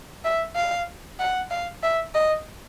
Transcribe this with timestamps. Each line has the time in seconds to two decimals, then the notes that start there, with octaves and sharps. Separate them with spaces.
0.24 E5
0.55 F5
1.20 F#5
1.50 F5
1.83 E5
2.14 D#5